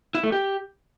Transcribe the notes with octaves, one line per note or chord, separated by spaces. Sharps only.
E4
A3
G4